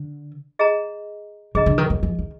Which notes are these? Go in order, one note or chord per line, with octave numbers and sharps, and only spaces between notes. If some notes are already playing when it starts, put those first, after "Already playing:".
Already playing: D3
G#4 D#5 A#5
D3 G#4 D#5 A#5
D3
D#3
F#3
F3
D#3